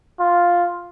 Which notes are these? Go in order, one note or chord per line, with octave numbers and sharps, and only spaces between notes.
F4